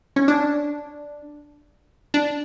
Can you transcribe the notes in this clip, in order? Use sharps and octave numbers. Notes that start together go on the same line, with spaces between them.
C#4
D4
D4